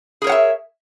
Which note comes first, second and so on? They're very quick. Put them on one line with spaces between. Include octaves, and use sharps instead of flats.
G#4 A#4 C#5 F#5 E5